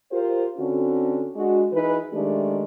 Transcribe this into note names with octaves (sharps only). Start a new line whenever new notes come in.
F4 G4 A#4 C5
D3 C4 C#4 F#4
G#3 D4 F#4
E3 D#4 G#4 B4
D#3 G#3 A3 D4 G4